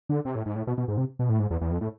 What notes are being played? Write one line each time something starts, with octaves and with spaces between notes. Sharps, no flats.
D3
C3
A2
G#2
A2
B2
B2
G#2
C3
B2
A2
G#2
E2
E2
F2
A2